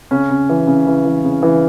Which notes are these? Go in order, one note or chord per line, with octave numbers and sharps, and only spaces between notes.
C#3 C#4
C#3
E3
C#3
E3
E3
C#3
E3